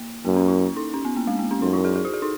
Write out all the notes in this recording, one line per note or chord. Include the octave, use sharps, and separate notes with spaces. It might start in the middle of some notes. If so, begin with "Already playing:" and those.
Already playing: A#3
F#2 A#3
C#4
E4
D#4
C#4
B3
A#3
G#3
A#3
C#4
F#2 D#4
E4
G#4
G#4
F#4
G#4
D#4